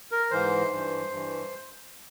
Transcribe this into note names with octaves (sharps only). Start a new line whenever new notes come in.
A#4
G#2 E3 C5
G2 E3
G2 E3